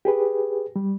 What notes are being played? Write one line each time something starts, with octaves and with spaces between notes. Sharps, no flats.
G4 G#4 B4
G3